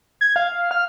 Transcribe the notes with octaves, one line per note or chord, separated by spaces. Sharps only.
G#6
F5
F6